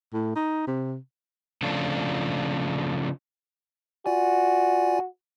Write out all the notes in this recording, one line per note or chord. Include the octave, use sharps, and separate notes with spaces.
A2
D#4
C3
C#3 F3 A3 C4 D4 F4
F4 F#4 D5 G#5